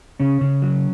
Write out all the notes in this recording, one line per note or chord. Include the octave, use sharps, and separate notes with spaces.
C#3 C#4
C#3
F#3